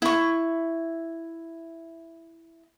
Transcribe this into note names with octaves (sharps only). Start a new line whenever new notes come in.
E4 C#6